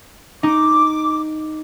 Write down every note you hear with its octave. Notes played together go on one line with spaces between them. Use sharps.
D#4 D6